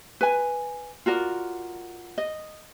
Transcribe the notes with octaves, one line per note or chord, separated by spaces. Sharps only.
B4 G#5
F4 F#4 A#4 D5
D#5